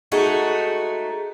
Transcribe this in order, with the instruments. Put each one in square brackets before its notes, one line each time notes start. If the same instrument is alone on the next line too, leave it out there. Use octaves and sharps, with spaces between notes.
[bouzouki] G#3 A3 D#4 F#4